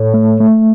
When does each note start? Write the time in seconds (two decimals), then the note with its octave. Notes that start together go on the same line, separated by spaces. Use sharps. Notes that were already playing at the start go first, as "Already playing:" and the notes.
Already playing: A2 A4 C#5
0.14 A3
0.40 A3